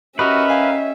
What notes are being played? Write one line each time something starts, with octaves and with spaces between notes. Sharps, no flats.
C#4 E4 F#4 G4 A#4 B4 D#5 E5
F5 G5 G#5